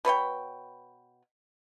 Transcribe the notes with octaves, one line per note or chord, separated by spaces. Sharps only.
B2 B4 C#5 G5